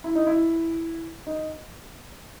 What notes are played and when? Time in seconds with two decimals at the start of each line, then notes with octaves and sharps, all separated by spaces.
0.04 E4
0.15 D#4
0.27 E4
1.26 D#4